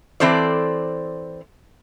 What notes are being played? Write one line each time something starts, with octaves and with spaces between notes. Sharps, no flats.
E3 C4 A4 C5 D5